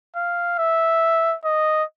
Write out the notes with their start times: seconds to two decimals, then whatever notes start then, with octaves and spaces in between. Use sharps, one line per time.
0.16 F5
0.59 E5
1.45 D#5